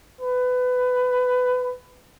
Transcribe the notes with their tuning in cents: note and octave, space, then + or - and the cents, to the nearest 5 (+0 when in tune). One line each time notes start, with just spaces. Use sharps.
B4 +20